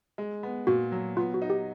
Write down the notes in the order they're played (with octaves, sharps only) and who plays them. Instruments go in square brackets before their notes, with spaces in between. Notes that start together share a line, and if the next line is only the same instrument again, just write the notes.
[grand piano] G#3
B3
[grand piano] A#2 [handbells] F#4
[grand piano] F#3
[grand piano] B3 [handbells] F4
[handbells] F#4
[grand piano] D#4
[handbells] G4